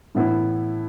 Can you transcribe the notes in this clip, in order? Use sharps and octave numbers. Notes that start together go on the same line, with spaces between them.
A2 E3 B3 E4